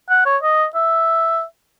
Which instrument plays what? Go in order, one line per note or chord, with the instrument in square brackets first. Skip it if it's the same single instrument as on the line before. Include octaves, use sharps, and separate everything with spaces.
[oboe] F#5
C#5
D#5
E5